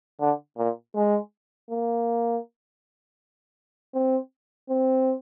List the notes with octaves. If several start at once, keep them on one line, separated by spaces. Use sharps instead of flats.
D3
A#2
G#3
A#3
C4
C4